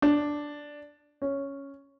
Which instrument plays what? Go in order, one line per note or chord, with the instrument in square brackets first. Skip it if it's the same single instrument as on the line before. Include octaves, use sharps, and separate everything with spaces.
[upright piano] D4
C#4